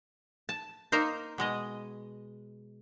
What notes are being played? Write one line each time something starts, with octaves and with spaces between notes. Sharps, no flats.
A5
A#3 D#4 A#4 C5
B2 G#3 D#5